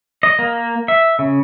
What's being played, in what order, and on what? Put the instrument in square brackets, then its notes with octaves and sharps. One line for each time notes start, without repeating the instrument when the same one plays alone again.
[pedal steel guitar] D#5
A#3
E5
C#3